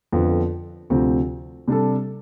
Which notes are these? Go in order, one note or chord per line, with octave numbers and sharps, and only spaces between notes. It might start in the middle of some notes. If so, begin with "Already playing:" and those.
F2 D3 F3 B3
D2 C3 F3 C4
C3 G3 D4 A4